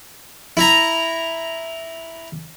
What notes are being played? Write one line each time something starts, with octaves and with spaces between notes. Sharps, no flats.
E4 A#5